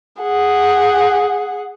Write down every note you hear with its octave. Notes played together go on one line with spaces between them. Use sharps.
G#4 F#5